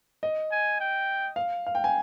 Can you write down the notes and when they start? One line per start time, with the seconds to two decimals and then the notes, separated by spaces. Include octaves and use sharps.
0.23 D#5
0.51 G#5
0.80 G5
1.36 F5
1.66 F5
1.75 G5
1.84 G#5